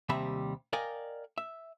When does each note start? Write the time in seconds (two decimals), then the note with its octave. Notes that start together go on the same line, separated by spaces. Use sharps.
0.09 D#2 C3 G3 E5 B5
0.73 A#4 D5 D#5 F5 G5 G#5
1.38 E5